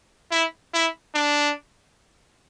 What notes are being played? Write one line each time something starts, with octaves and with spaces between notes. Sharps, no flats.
E4
E4
D4